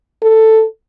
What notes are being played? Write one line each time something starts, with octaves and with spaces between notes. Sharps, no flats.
A4